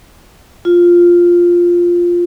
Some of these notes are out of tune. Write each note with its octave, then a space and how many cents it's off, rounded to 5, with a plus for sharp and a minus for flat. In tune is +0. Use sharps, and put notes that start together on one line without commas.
F4 +0